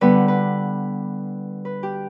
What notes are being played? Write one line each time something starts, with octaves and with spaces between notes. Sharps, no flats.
D3 G3 B3 B4
B4
B4
G4